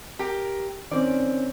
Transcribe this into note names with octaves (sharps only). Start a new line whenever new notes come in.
G4 A#4
D#3 C4 C#4 D5